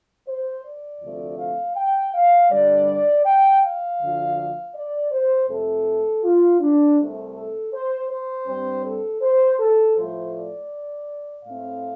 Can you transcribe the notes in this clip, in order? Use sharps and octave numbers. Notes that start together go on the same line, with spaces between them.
C5
D5
D2 C3 F3 A3 C4
F5
G5
F5
G2 D3 G3 D5
G5
F5
D2 D3 F3
D5
C5
F2 C3 A3 C4 A4
F4
D4
C2 C3 A3
A4
C5
C5
G2 G3 C4
A4
C5
A4
A2 F3 A3 C5
D5
A2 A3 C4 F5